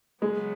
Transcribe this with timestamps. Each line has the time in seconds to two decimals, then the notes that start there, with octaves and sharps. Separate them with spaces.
0.22 C#3 F#3 G#3 B3